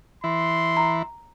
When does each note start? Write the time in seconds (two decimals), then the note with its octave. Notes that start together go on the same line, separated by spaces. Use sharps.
0.24 E3 E4 C6
0.77 A#5